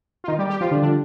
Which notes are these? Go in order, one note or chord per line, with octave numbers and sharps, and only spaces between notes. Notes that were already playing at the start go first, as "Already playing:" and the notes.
F4
D#3 D#4
G3 G4
G3 G4
F3 F4
D3 D4
D3 D4